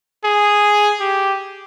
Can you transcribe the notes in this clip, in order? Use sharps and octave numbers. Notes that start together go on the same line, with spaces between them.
G#4
G4